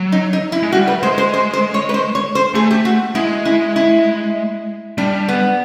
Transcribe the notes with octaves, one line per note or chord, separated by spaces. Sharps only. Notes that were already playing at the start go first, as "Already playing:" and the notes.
Already playing: F#3
D#4
D#4
E4
G#3
G3 F#4
B4
G#3 C5
C5
C5
C5
C#5
B4
C5
C#5
C5
A3 G#4
G4
F#4
G#3 E4
E4
E4
G3 D4
B3